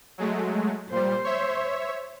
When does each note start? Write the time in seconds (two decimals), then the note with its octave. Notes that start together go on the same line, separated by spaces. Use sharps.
0.18 F#3 G#3 A3
0.92 A#2 G3 C5
1.24 C#5 E5